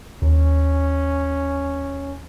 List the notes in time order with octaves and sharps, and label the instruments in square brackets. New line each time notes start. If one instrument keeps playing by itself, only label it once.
[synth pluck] D#2 [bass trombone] C#4